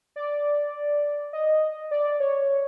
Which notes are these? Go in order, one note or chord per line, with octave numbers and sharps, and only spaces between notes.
D5
D#5
D5
C#5